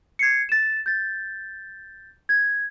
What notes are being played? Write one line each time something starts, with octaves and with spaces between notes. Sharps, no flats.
G#6 C7 C#7
A6 E7
G6 A6
G#6